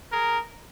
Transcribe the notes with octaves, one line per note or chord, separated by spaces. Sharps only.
G#4 A#4